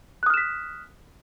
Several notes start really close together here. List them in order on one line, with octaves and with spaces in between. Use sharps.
F#6 D#6 F6 E7 B6